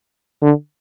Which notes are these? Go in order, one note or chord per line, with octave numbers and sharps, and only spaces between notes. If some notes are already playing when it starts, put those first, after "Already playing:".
D3